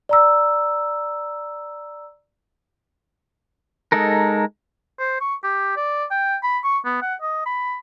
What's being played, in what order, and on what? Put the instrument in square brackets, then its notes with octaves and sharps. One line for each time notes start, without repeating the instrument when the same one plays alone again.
[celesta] D5 A#5 E6
[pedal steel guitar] G#3 D#4 A4 A#4
[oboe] C5
C#6
G4
D5
G5
B5
C#6
B3
F#5
D#5
B5